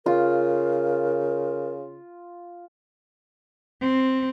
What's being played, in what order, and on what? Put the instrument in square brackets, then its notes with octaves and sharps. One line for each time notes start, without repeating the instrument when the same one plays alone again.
[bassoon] C#3 [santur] F4 [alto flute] A#4
[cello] C4